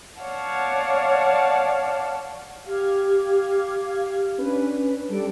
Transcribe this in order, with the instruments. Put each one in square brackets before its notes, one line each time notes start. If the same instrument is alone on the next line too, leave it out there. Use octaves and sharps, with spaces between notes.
[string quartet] C#5 D5 F5 F#5 A5
[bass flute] G4 [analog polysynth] F5 F6 G#6
[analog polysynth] C#4 D4 B4
[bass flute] G3 [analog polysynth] A4 D7